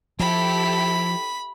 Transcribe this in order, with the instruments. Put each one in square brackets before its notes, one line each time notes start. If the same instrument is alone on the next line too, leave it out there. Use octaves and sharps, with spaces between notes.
[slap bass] F3 [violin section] E4 G4 A4 [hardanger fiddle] B5